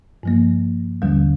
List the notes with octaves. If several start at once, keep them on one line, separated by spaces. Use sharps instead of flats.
G2 F3 A#3
D#2 D3 G3